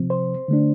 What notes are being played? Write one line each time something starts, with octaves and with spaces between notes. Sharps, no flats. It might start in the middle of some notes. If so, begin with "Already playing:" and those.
Already playing: C3 F3 C4
C5
D3 A3 D4